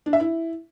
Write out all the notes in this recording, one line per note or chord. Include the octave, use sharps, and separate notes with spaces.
D4
E5
E4